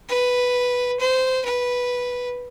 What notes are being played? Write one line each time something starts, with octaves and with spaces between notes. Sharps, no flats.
B4
C5
B4